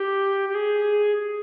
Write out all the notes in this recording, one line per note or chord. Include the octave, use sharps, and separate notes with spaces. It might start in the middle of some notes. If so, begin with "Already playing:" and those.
Already playing: G4
G4
G#4